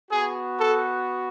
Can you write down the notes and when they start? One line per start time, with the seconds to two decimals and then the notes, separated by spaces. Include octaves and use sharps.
0.10 B3 F#4 G#4
0.59 A4